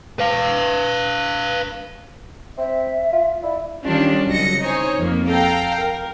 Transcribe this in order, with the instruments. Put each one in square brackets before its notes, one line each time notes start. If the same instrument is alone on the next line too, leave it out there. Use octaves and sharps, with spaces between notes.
[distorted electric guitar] B4 F5
[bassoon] C4 [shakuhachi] E5
[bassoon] F4
[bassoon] E4 [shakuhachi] D5
[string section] D#3 G3 C#4 D4 F4
C2 C#3 F#3 D#5 A#6 C#7
D#4 C5 C#5 G#5
F2 A#3
A4 F5 G5 A#5
A#4